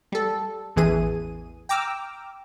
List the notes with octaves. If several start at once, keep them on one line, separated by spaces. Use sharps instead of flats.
G3 A4
A1 E2 E3 G#4 D#7
G5 A#5 D6 E6 F6